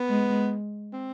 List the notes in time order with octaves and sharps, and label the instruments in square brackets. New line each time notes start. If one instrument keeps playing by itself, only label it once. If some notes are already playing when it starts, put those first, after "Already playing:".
Already playing: [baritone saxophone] B3
[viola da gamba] G#3
[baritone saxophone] C4